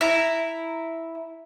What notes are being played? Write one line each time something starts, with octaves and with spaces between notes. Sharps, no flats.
E4 A#5